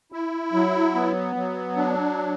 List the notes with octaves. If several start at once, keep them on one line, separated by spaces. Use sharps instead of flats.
E4
F#3
B3
F#3
D4